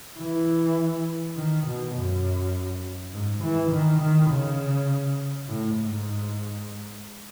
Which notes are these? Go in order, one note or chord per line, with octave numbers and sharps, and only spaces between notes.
E3
D#3
B2
F#2
G#2
E3
D#3
D#3
C#3
A2
G#2